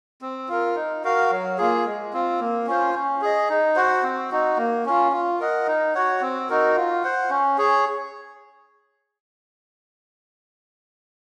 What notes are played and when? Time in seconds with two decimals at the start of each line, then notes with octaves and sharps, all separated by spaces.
0.22 C4
0.49 F4 A#4
0.76 D#4
1.04 F#4 A#4 F5
1.31 F#3
1.58 A#3 F4 G#4
1.85 G#3
2.13 C4 F4
2.40 A#3
2.67 C#4 F4 C5
2.94 C#4
3.22 G#4 D#5
3.49 D#4
3.76 F#4 C5 F#5
4.03 C4
4.31 D#4 F#4
4.57 A#3
4.86 C#4 F4
5.12 F4
5.40 A#4 D#5 F#5
5.67 D#4
5.95 F#4 C#5 F#5
6.21 C4
6.49 D#4 F#4 A#4
6.76 F4
7.03 C5 F#5
7.30 C#4
7.58 G#4 C#5